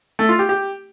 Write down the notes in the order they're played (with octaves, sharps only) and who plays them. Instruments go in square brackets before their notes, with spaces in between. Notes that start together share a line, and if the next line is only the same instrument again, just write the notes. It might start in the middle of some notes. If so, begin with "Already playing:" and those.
[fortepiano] A3
F4
G4
G4